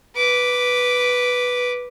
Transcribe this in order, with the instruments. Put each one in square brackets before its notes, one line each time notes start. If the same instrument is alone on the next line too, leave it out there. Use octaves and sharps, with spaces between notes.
[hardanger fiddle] B4 D6